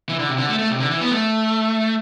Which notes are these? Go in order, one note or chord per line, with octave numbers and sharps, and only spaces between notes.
E3
D3
C3
D3
A3
A3
C3
D3
E3
B3
A3